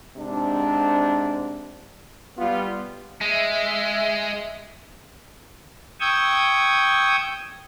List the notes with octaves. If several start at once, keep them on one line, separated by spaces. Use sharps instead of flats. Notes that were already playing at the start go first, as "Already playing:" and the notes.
G#2 C3 D4
G3 B3 F4
G#3 E5
G5 C#6 D#6 E6 G6 G#6